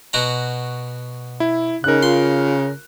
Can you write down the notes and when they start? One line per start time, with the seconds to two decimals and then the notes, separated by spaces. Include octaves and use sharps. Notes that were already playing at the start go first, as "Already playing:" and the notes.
0.13 B2 F#4 A#5
1.40 E4
1.84 C#3 D#4 A#4 F#6
2.03 F4 C6